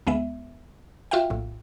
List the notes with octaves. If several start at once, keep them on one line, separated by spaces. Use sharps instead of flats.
D2 G#3 B3 E5
F4 F#4 E5 F5 G5
A#1 A2